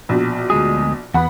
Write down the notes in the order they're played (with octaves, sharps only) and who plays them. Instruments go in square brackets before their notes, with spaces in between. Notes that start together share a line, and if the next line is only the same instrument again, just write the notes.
[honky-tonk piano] A#1 B2
[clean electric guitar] D2 G#3 G#4
[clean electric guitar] E2 B3 [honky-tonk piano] F#5 B5